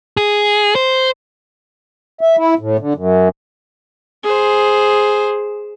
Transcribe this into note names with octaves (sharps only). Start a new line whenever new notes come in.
G#4
C5
E5
E4
A2
D3
F#2
G#4 C5